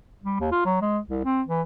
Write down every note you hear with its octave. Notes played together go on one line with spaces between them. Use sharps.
G3
D#2
F4
F#3
G#3
C2
C4
E3